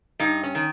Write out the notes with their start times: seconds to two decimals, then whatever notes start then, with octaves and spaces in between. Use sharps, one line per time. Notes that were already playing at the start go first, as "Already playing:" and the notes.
0.20 G2 D#4
0.43 C#4
0.55 D#3